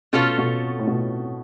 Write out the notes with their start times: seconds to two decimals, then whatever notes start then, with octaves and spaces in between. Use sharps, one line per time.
0.13 B2 A3 C#4 F4 A4 C#5
0.38 B2
0.79 A2
0.87 B2